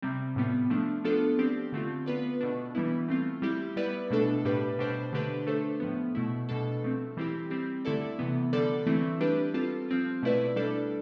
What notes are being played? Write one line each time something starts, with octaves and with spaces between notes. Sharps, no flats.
C3 G3 C4
A2 G3 B3 F4
F3 A3 D4
F3 B3 D4 F4 A4
F3 C4 G4 D5
D3 A3 C4 F4
B3 F4 B4 D5
B2 A3 D4
E3 G3 B3 E4
A3 C4 F4
G3 C4 E4 G4
G3 B3 E4 B4 D5
B2 A3 D4 A4
A2 G3 D4 G4 B4
B2 G3 D4 G4 C5
D3 A3 D4 G4 B4
A3 D4 A4 C5
A2 F3 B3
B2 A3 E4
B2 G3 D4 A4
F3 A3 C4
E3 G3 C4 E4 G4
G3 C4 G4
D3 A3 E4 A4 D5
C3 E3 B3
D3 G3 D4 A4 D5
E3 A3 C4 E4
G3 D4 G4 B4
G3 C4 F4 A4
F3 C4 F4
B2 A3 E4 B4 D5
G3 D4 A4 D5